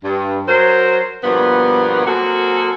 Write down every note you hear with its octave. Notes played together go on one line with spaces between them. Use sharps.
G2
F#3 A#4 C5
G2 B2 F3 A#3 B3
F#3 A#3 C4 F#4 G#4 A4